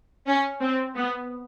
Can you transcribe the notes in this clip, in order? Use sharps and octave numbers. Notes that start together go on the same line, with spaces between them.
C#4
C4
B3